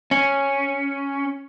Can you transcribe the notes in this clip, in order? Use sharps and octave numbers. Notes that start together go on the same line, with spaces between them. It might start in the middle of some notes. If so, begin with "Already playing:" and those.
C#4